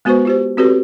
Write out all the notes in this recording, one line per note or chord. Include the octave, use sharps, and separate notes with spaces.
G#3 B3 F#4 B4 C5 C#6
F4 G4 C5
C4 F#4 G4 A4 B4 C#5